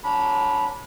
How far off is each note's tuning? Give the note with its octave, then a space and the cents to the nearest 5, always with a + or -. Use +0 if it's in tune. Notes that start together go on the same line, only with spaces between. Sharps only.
F#3 -20 D4 -25 B5 -10